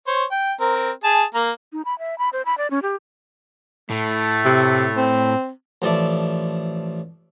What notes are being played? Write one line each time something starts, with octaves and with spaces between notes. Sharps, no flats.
C5 C#5
G5
C4 A#4
G#4 A5
A#3 A#5
D#4
B5
E5
B5
C5
B5
D5
C#4
G4
A2 A3
C3
C4
A1 F3 A4 D5 E5